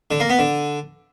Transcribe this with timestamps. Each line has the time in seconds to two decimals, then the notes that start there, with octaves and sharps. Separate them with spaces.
0.11 D3
0.20 A#3
0.29 B3
0.39 D3